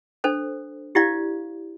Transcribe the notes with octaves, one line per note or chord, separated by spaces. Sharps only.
D4 A4 C5
E4 G4 D5 F5